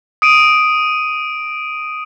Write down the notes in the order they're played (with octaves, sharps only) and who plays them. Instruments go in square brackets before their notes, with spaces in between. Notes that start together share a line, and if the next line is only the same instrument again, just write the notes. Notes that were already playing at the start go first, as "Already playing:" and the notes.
[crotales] D#6 D7 D#7